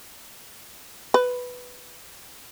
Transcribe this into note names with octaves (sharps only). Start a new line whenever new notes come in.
B4